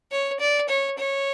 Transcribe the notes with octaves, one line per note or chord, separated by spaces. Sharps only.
C#5
D5
C#5
C#5